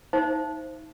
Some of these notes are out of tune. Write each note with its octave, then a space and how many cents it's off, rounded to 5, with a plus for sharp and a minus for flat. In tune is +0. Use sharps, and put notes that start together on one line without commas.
D#4 +25 C5 +0 E5 +45